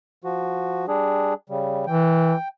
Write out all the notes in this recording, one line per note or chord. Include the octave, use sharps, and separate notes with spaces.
F3 F#4
G3 D4 G#4
C#3 G3
E3 G5